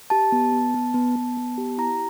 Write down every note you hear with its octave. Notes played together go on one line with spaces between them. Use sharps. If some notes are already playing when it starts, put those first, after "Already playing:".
G4 A5
B3
B3
B3
B3
B3
B3
G4
E4 A#5